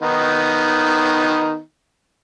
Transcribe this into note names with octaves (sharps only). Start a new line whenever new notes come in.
D#3 B3 D#4